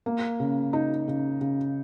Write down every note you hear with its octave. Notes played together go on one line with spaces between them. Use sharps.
A#3
C#3
D#4
C#3
C#3